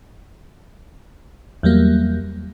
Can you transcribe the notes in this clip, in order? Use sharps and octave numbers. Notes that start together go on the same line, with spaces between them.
E2 F#3 G3 A#3